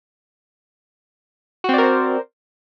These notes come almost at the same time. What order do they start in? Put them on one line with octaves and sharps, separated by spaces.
F#4 C4 D5 A#4 C5